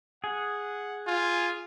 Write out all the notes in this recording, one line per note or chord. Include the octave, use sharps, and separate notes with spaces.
G#4 F#5
F4 G#5